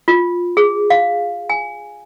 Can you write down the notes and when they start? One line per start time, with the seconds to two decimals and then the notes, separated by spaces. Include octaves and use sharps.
0.08 F4
0.57 G#4
0.90 F5
1.50 G#5